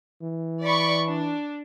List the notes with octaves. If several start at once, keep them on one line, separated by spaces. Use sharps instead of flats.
E3
D5 B5 C#6
D4